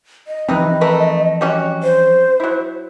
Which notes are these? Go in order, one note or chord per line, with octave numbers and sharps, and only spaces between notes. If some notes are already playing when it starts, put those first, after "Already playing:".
D#5
C3 E3 F3 C4 D#4 B4
A3 A#4 B4
G3 C#4 F#4
C5
F#3 E4